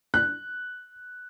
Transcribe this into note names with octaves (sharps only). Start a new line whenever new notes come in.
F#6